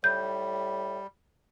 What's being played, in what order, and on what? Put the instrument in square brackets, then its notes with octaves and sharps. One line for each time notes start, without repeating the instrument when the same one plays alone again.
[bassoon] A2 [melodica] G3 [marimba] G6